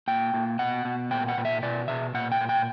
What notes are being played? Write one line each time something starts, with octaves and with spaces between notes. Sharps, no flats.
A#2 G5
A#2
B2 F#5
B2
A#2 G5
F#5
A#2
E5
B2 D5
B2 E5
A#2 F#5
G5
A#2
G5